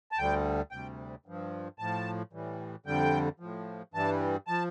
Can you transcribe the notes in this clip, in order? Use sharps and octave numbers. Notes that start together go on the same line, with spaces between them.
A5
D2 D3 G3 G5
D2 C3 G3 G5
G2 F3
A2 F3 A5
A2 E3 G3
F2 D3 G3 G5
A2 F3
G2 E3 G3 A5
F3 A5